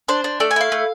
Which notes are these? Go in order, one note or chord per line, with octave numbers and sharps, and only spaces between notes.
D4 C5
D4
A3 D5
G#5
E4 F5
A3